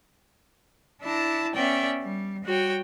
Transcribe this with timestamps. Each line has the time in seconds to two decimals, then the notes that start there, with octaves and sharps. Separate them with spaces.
1.02 D4 E4 A5 A#5
1.54 B3 C#4 D5 E5 G5
2.03 G3
2.45 G3 F#4 C#5 G5